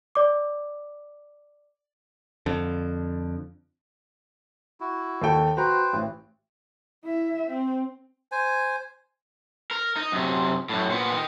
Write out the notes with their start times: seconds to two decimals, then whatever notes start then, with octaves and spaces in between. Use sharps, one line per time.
0.15 D5 D6
2.46 F2 D3
4.80 E4 F#4
5.22 D#2 A4 G5
5.57 F#4 B4 C5 G5 A#5
5.93 A1
7.04 E4 E5
7.48 C4
8.32 C5 G#5
9.71 A#4
9.96 D#4
10.12 F#2 C3
10.69 F#2 A2
10.90 A#2 B3
11.12 D#3